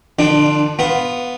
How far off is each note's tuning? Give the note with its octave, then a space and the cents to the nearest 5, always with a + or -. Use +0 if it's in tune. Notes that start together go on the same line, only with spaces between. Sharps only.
D3 +35 F3 +0 D4 +10
B3 +0 F4 +0